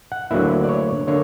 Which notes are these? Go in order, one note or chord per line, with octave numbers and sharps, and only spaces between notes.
F#5
D2 D3 F#3 A#3 E4 E5
D5
C#5
D3 A#3 C#5